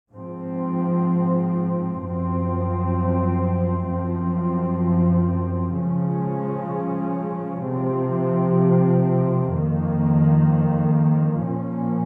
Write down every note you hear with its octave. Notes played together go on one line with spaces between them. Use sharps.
G#2 F3 C4
F#2 F3 C4
F#2 F3 C4
C#3 F3 G#3 C#4
C3 F3 C4
F2 D#3 A#3
A#2 F3 A#3 C#4